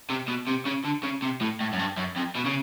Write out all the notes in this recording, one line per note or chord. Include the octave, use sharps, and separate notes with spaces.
C3
B2
C3
C#3
D3
C#3
C3
A2
A2
F#2
G2
F#2
F2
B2
C#3